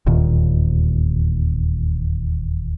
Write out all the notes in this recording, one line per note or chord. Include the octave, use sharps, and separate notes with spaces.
E1 D#2 A#2 D#3